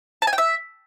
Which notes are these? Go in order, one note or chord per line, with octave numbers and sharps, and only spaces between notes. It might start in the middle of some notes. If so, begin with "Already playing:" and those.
A5
G#5
G5
E5